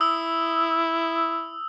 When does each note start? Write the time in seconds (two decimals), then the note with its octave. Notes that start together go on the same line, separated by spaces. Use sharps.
0.01 E4 D#6 E6